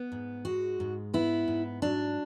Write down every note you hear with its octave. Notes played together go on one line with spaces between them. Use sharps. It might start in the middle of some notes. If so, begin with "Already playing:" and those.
Already playing: B3
G#2
G#3 F#4
G#2
B3 E4
G#2
F#3 D4